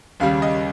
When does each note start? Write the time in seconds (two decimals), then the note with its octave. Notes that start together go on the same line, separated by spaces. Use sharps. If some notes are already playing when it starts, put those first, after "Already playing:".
0.20 D#2 C#3 G3 F5
0.42 D#5